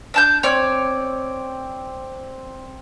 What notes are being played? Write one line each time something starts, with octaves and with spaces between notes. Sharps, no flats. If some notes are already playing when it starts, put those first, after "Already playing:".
D4 A5 G6
C4 C#5 D5